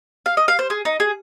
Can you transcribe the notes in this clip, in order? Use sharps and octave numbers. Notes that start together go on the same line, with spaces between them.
F5
D#5
F5
C5
G#4
D#4
G#4